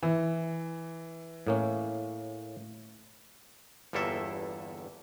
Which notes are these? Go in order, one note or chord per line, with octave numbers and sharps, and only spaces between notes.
E3
A2 A#3 C#4
G1 E2 G2 A#3 A4 E5